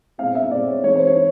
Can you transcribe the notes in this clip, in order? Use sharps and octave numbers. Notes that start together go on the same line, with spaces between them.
B2 G#3 C4 F5
E5
B2 G#3 C4 D5
C#5
E3 G#3 C4 D#4 C#5
C5
C#5